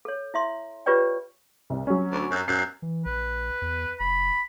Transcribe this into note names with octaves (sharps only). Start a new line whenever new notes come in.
A4 C#5
E4 E5 C6
F4 G4 B4 C#5 D5 G5
C2
F#3 C#4
D2
F#2
F#2 C7
E3
A#1 B4
E2
F#1 B5